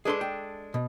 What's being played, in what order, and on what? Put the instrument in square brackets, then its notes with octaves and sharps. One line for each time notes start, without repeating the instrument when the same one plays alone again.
[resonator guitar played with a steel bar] G#3 D4 A4 [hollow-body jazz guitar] G#4 B4 C6
[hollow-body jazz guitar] G5
B2